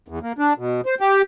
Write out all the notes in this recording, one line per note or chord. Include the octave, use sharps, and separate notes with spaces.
E2
A#3
D4
B2
C5
G4